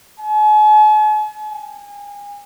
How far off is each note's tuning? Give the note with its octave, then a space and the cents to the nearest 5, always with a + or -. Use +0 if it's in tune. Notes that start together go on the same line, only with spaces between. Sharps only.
G#5 +45
G#5 -35